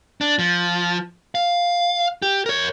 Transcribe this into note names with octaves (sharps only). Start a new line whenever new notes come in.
D4
F3
F5
G4
A#4 C#5